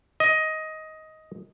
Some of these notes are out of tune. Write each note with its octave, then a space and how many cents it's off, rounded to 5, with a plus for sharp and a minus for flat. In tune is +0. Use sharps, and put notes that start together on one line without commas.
D#5 +15